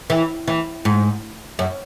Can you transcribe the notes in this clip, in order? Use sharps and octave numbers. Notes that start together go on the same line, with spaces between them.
E3
E3
G#2
F#2